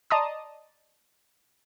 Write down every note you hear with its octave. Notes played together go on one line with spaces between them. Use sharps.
D5 D#5 A5 A#5 C6 D#6